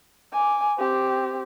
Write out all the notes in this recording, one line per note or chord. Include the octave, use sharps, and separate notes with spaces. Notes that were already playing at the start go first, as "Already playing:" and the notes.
G#5 D6
C4 G4